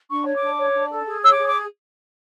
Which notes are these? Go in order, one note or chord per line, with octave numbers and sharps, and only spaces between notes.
D4 C#6
C#5
D6
D4
C#5
D4
A4
G#4
C#5 E6
D6
G#4
D6